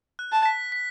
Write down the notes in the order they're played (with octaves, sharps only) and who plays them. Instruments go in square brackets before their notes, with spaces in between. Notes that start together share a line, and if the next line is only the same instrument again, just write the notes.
[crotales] F#6
[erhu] A5
[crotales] B6
B6